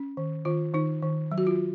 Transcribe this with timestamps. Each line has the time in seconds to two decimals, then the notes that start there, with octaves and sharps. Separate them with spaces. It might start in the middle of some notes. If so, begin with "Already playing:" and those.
Already playing: C#4
0.17 D#3
0.45 D#3 F4
0.74 D#3 D#4
1.02 D#3
1.32 F#3
1.38 F#4
1.47 F4